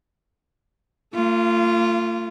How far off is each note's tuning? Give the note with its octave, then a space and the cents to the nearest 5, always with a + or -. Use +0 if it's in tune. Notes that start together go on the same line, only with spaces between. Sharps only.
A3 +45 F4 -15